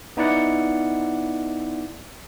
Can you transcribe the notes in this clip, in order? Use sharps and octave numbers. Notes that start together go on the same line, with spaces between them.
B3 D#4 E4 D5 F#5